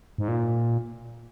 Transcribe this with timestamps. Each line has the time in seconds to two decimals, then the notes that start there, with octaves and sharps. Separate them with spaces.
0.18 G#2
0.28 A#2